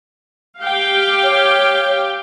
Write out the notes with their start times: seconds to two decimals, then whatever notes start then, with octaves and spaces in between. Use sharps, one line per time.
0.59 G4 F5 G5
1.23 C#5